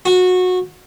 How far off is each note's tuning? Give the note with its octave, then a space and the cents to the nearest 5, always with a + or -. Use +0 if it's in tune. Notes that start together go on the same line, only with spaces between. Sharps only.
F#4 -20